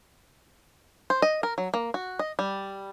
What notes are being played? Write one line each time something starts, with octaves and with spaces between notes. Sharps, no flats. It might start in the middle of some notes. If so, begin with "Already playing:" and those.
C5
D#5
A#4
F#3
A#3
F#4
D#5
G3